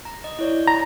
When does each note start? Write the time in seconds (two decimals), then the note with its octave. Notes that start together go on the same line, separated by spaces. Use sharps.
0.05 A#5
0.24 D#5
0.39 E4 C#5 D5
0.68 A#5